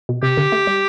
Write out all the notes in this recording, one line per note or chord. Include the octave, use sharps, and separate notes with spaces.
B2
C3 G4
D3
A3
G3